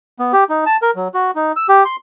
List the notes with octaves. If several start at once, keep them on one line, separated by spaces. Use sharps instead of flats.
B3
G4
D#4
A5
A#4
F#3
F#4
D#4
E6
G4
C6